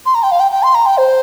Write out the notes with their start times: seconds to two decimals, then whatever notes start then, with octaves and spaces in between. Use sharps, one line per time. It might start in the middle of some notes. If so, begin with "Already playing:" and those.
0.06 C6
0.15 A#5
0.23 G5
0.31 F5
0.40 G5
0.51 G5
0.63 C6
0.75 A#5
0.86 G5
0.98 C5